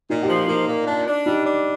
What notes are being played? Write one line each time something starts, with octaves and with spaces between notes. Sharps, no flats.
A#2 D#4
G4
F3
F4
A#3 D#4
A#2
D4
D4
G3 D#4
D4